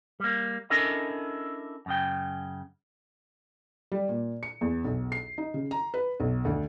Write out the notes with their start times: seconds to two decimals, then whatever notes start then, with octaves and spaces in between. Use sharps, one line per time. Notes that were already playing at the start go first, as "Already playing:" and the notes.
0.20 G3 A#3
0.70 C#4 D4 E4 A4 A#4 D#5
1.86 F#2 C#3 G5
3.92 G3
4.09 A#2
4.43 C#7
4.61 E2
4.85 B1
5.12 C7
5.38 D#4
5.54 C#3
5.71 A#5
5.94 B4
6.20 B1
6.45 D2